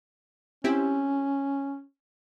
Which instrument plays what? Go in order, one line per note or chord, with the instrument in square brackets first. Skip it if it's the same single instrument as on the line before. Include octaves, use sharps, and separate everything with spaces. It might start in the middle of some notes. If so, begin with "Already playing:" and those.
[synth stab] C4 E4 G4 [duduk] C#4